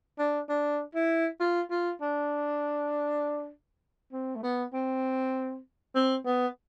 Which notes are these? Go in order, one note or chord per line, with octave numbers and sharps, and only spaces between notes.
D4
D4
E4
F4
F4
D4
C4
A3
B3
C4
C4
B3